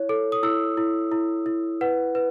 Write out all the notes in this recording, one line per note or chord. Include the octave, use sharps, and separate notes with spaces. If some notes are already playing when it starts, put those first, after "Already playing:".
Already playing: E4 C#5
A4
D#6
E4 E6
E4
E4
E4
B4 F#5
B4